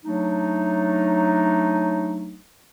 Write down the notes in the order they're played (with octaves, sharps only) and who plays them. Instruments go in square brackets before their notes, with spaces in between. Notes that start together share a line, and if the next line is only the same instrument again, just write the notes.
[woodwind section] F#3 A3 D4 D#4